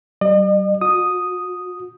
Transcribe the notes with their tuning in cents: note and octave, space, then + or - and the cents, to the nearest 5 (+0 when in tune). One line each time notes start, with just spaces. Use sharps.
G3 -35 D#5 -45
F#4 -40 D#6 +0